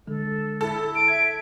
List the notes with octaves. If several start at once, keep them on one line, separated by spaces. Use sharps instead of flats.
D3 G#3 A4
E4 A4
D7
E5 G#6